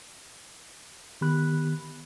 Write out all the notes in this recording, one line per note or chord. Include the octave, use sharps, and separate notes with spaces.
D#3 B3 G4 B5 F#6